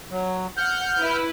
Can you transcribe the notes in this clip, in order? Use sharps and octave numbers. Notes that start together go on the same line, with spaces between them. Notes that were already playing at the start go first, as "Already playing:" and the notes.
F#3
F#5 F6 G6
E4 B4